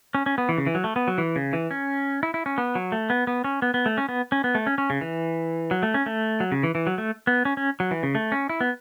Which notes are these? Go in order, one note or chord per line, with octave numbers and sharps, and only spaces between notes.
C#4
C#4
B3
E3
C#3
E3
F#3
A3
B3
F#3
E3
C#3
E3
C#4
E4
E4
C#4
B3
F#3
A3
B3
B3
C#4
B3
B3
A3
C#4
B3
C#4
B3
A3
C#4
C#4
C#3
E3
F#3
A3
C#4
A3
F#3
C#3
E3
E3
F#3
A3
B3
C#4
C#4
F#3
E3
C#3
A3
C#4
E4
B3